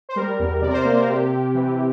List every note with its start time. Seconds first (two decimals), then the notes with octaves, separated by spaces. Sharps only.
0.09 C5
0.16 G3 A#4
0.39 E2
0.62 C3 D5
0.69 A#4
0.73 C5
0.85 A#3 C5
0.96 A#4
1.08 C3 G4
1.32 C3
1.54 E3